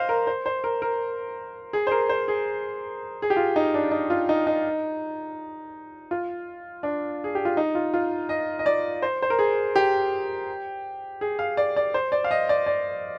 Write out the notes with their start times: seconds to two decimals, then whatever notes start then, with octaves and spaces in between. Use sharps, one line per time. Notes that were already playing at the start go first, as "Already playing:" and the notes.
Already playing: C5 D#5 F5
0.09 A#4
0.27 C5
0.46 C5
0.64 A#4
0.82 A#4
1.73 G#4
1.87 C5
1.91 A#4
2.09 C5
2.28 G#4
3.22 G#4
3.30 G4
3.37 F4
3.56 D#4
3.74 D4
3.91 D#4
4.10 F4
4.29 D#4
4.47 D#4
6.11 F4
6.83 D4
7.24 G#4
7.35 G4
7.45 F4
7.57 D#4
7.75 F4
7.94 F4
8.29 D#5
8.59 D#5
8.66 D5
9.02 C5
9.22 C5
9.30 A#4
9.39 G#4
9.76 G4
11.21 G#4
11.39 F5
11.57 D5
11.76 D5
11.94 C5
12.12 D5
12.24 F5
12.31 D#5
12.49 D5
12.66 D5